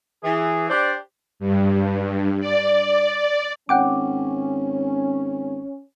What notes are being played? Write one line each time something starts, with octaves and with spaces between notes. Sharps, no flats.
E3 G#4
D4 G4 C5 D5
G2
D5
G#1 C#4 F#5 G5 D6